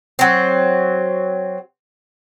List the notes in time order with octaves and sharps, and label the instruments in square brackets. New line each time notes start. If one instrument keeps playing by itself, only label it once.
[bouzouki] F#3 C4